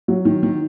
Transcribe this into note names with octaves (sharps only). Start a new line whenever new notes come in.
F#3
D#3
D#3